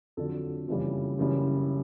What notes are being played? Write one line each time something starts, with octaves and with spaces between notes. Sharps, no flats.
F2 D3 F#3 A4
F#1 F2 C#3 E3 G3
F#1 F#2 C#3 E3 G3